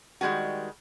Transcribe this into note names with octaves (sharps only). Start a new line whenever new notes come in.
D#3 G3 G#3 B3 F#4